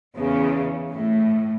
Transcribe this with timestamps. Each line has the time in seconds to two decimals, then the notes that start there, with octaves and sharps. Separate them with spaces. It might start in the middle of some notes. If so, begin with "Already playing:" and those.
0.16 E2 C#3
0.91 A2